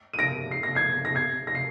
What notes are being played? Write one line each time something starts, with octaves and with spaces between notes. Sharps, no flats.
D#7
A#6 D7
C7
A#6
G#6 C7
A#6
G#6 C7
A#6
C7